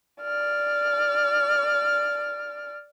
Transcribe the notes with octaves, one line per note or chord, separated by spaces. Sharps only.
D5 F6